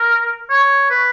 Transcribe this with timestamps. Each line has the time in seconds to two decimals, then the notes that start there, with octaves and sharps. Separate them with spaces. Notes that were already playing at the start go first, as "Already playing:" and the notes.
Already playing: A#4
0.50 C#5
0.90 B4